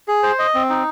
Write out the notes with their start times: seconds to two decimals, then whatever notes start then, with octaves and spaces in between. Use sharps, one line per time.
0.08 G#4
0.23 C5
0.39 D#5
0.54 C4
0.70 D#4